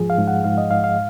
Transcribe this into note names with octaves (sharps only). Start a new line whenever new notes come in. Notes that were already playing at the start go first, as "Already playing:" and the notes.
Already playing: G#2 F3 G#4
F5
G#2
F#5
G#2 F5
D#5
G#2 F5
F5